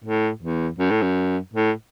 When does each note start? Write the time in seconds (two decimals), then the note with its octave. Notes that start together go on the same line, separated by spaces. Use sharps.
0.04 A2
0.42 E2
0.79 F#2
0.90 A2
1.02 F#2
1.54 A2